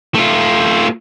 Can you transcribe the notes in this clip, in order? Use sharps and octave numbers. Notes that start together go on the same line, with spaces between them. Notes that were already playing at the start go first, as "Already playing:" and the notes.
A3 F4